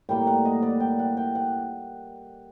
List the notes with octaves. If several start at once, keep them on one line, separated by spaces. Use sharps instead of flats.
A2 G3 A#3 G5
F#5
D#5
D5
G5
F#5
G5
F#5